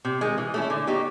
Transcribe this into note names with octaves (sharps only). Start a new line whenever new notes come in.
C3
D#3 G#3
E3
A3 C#4 E4
D3
F#3 B3 D#4 G4